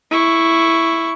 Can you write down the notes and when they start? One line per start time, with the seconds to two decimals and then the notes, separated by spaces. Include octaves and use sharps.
0.11 E4 C#6